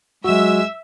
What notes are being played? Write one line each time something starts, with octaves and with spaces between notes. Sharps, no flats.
F#3 G#3 F#4 E5 E6